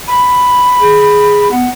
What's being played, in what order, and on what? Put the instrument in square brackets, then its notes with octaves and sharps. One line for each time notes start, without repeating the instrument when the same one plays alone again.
[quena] B5
[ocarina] G#4
[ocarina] B3 [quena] F#5